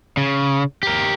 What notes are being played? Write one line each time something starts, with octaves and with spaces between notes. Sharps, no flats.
C#3
G4 A#4